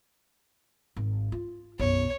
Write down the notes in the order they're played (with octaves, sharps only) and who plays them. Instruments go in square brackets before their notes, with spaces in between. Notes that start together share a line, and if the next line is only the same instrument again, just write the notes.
[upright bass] G#1
F4
[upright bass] B1 F#2 [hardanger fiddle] C#5